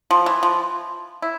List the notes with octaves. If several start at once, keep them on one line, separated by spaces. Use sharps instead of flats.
F3
E3
F3
E4